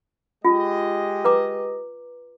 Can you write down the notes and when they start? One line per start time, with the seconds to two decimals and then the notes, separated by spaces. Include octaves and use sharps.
0.45 G#3 F4 G4 D#5
1.25 B4 A#5 D6